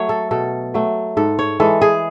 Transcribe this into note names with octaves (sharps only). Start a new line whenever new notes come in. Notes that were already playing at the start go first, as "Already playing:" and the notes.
Already playing: F#3 A3 C#5
A4
B2 A4
F#3 A3
G#2 A4
C#5
E3 G#3 A4
G#4